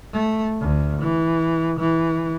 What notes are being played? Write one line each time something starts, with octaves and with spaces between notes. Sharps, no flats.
A3
D2
E3
E3